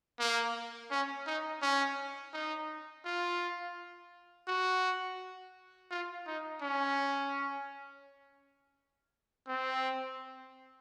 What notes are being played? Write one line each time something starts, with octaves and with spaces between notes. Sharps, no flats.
A#3
C#4
D#4
C#4
D#4
F4
F#4
F4
D#4
C#4
C4